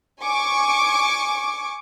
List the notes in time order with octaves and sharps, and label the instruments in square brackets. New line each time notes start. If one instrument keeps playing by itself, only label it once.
[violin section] G#5 C#6 D6